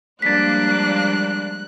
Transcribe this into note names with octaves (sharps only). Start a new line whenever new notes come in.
F3 G3 G#3 A#3 D4 F#6 A6 B6